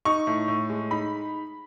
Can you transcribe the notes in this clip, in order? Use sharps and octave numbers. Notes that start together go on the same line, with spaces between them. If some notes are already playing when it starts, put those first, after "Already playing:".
D#4 C#6
A2
A2
G#3
D#4 B5